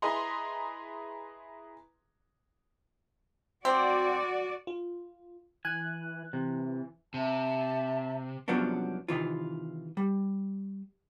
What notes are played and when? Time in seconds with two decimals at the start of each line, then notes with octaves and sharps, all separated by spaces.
0.02 E4 G#4 B4 D#5 A#5 C6
3.65 C4 F#4 D5
4.67 F4
5.65 E3 G#5 F#6
6.33 C3 E3
7.14 C3 E5 A5
8.48 C2 F3 F#3 B3 C#4 D4
9.08 C3 D#3 E3 F4
9.97 G3